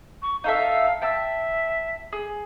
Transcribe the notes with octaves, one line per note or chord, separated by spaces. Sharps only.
C#6
D#4 A4 E5 F5
E5 G5 A5 E6
G#4